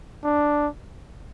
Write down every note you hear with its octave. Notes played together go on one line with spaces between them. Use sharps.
D4